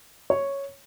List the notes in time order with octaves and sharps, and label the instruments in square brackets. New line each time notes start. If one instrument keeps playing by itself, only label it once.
[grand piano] C#5